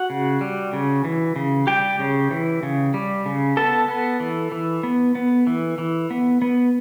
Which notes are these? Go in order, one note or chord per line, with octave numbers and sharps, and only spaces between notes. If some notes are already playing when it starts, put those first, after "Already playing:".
Already playing: F#4 F#5
C#3
G3
C#3
E3
C#3
G3 G4 G5
C#3
E3
C#3
G3
C#3
B3 A4 A5
B3
E3
E3
B3
B3
E3
E3
B3
B3